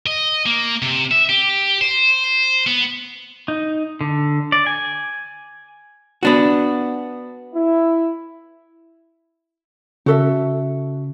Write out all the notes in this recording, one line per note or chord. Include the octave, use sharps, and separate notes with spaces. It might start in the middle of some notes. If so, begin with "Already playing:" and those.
D#5
A#3
C3
E5
G4
C5
B3
D#4
D3
D5
G#5
B3 D4 F#4
E4
C#3 F#4 A4 E5